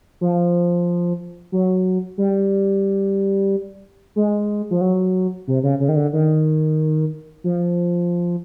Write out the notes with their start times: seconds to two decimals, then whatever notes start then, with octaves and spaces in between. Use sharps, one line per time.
0.21 F3
1.52 F#3
2.18 G3
4.16 G#3
4.70 F3
4.81 F#3
5.48 C3
5.63 C#3
5.80 C#3
5.89 D#3
5.96 D3
6.13 D#3
7.44 F3